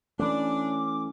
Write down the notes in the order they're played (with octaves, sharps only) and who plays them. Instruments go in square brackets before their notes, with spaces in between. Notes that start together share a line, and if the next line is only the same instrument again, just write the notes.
[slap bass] E3 A3 [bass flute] C#4 [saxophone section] D4 [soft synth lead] D6